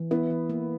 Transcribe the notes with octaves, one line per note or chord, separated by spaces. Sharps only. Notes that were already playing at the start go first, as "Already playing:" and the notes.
Already playing: E3
B3 E4
E3
A#3